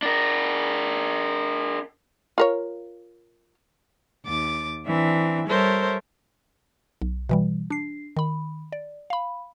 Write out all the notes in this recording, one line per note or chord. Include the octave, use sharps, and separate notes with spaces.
D4 A#4
F4 A#4 C#5
D#2 D6 A6
E3 C4 D4 E5
G3 A4 A#4 C5 C#5 E5
B1
B2 E3 G3
D4 C7
D#3 B5
D5
F5 B5